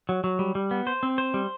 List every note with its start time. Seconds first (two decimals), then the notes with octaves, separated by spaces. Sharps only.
0.09 F#3
0.24 F#3
0.39 G3
0.55 G3
0.71 B3
0.87 C5
1.03 C4
1.18 C5
1.34 G3